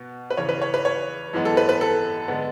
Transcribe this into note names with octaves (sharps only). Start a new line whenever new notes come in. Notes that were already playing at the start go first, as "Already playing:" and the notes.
Already playing: B2 B3
B4
E2 C#3 E3 C#5
B4
C#5
B4
C#5
F#2 E3 G#3 B3
A4
B4
B4
A4
D3 G#3 B3